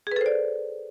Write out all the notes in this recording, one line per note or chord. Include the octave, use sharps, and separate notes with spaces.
G#4 A4 B4 C5 D5